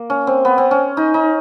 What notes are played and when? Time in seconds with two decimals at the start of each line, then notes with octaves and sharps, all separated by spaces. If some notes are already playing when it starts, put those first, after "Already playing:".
Already playing: A#3
0.10 C#4
0.27 C4
0.45 B3
0.58 C4
0.71 C#4
0.97 D#4
1.14 D#4